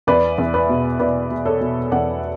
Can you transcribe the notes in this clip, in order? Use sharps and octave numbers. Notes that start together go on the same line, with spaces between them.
E2 B4 D5
E2
B4 D5
B2
B2 B4 D5
B2
A4 C#5
B2
E2 D5 F#5